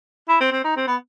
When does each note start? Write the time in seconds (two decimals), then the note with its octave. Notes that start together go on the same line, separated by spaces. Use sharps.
0.28 E4
0.40 C4
0.52 C4
0.64 D#4
0.76 C4
0.87 B3